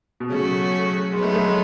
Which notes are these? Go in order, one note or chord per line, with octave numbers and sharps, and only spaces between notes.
B2
C#3 F#3 A3 C#4 F#4
F#3 G#3 B3 D#4
A3
A3
G#3